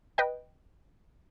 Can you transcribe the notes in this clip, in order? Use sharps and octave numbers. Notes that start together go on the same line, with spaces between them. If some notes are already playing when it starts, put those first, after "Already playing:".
B4 D#5 G5